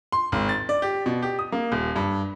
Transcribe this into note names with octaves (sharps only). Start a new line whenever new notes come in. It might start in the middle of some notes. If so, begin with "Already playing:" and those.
C6
G#1
A6
D5
G4
B2
G4
D#6
A#3
D#1
G2